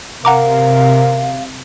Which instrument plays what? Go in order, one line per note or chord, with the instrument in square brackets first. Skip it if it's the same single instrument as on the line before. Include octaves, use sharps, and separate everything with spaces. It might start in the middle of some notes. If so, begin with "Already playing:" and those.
[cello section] C3 [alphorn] A#4 [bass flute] F5 [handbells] F#5 A#5 D6